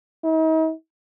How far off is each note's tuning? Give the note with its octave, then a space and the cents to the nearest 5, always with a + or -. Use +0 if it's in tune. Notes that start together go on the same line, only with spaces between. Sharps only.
D#4 +45